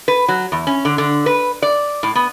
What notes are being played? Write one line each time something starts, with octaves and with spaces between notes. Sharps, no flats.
B4
F#3
E2
C#4
D3
D3
B4
D5
A2
B3